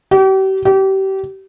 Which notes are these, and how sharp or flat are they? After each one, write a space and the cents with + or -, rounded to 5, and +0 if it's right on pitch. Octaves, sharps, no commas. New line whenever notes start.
G4 -40
G4 -30